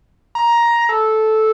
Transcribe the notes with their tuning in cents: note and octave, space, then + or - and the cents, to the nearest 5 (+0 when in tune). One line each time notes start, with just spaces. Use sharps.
A#5 +10
A4 -10